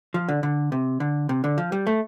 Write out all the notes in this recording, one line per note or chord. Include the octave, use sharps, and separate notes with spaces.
F3
D3
D3
C3
D3
C3
D3
F3
G3
A3